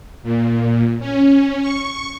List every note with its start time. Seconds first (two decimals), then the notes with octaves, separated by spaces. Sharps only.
0.23 A#2
1.00 C#4
1.62 C#6